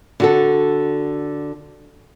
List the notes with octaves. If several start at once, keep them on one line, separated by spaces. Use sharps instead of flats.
D3 F#4 A4